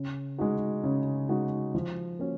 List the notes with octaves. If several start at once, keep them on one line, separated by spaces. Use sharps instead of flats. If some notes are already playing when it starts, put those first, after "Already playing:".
Already playing: C#3
G#3 D#4 F#4
C#3
G#3 D#4 F#4
F3
A#3 C#4 F#4